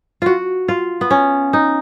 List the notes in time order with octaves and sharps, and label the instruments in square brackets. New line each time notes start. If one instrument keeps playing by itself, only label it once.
[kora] F4 F#4
F4
B3
C#4
D#4